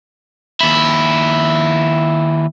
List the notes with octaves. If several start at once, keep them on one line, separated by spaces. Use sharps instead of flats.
D#2 E4